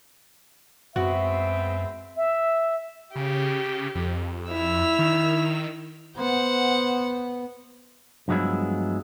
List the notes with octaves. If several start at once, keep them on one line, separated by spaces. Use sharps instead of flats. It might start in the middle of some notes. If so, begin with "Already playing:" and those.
F#2 G#3 B3 C4 F#4 E5
E5
C#3 G4
F2
E4 E6 F7
D#3
B3 C5 F#5
G2 F3 F#3 G#3 B3 E4